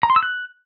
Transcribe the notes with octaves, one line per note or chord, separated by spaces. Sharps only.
A#5
C6
E6
F#6